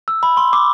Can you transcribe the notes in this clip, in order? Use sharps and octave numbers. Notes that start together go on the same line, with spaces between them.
E6
B5
C6
D6